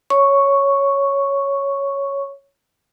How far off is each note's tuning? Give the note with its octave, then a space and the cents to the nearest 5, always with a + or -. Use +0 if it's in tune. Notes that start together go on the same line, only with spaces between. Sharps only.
C#5 +0 C#6 +0